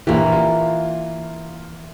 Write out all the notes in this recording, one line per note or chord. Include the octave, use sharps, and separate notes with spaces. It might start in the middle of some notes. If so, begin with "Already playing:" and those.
A#1 E3 A#3 G4
F4